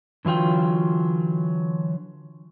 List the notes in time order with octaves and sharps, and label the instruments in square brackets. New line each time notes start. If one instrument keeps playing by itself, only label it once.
[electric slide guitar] D3 E3 F#3 F4 G5